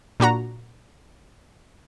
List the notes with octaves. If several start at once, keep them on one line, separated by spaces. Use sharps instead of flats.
A#2 D4 F#4 A#5